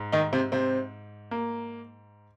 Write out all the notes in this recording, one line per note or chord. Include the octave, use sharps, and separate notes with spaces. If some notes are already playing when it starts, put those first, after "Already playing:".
Already playing: G#2
D#3 D#4
C3 C4
C3 C4
A#3